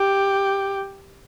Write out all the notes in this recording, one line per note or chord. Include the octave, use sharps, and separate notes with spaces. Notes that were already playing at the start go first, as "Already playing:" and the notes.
Already playing: G4